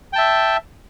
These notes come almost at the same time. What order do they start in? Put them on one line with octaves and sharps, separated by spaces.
G5 A5 E5